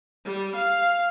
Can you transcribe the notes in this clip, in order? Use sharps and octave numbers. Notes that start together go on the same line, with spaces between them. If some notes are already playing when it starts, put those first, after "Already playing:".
G3
F5